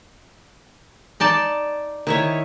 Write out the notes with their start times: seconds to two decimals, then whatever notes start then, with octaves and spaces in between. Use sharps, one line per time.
1.20 D#4 D5 A5
2.07 D#3 E4 C#5